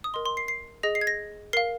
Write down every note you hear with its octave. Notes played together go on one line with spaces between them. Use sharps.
D#6
A#4 D#5 C6
C6
C7
C7
G#4 D#5 A#6
C7
G#6
A#6
A#4 F5 C7